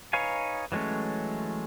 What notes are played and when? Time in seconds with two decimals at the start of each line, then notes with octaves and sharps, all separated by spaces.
0.13 D#4 B4 C#5 F5 G#5
0.72 E3 F#3 G#3 A3 C#4